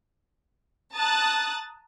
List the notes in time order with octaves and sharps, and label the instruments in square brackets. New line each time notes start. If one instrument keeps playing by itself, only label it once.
[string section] A5 A#5 D#6 F#6 A6